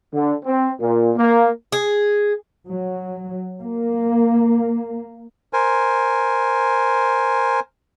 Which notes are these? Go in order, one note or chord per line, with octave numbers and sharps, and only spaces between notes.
D3
C4
A#2
A#3
G#4
F#3
A#3
A#4 C5 G#5